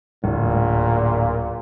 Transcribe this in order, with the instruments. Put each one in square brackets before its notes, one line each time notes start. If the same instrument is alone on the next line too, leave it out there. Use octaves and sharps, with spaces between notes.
[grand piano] D1 [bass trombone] A#2